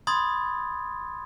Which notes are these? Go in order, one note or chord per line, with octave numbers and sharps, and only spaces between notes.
B5 C6 D#6 G#6 A6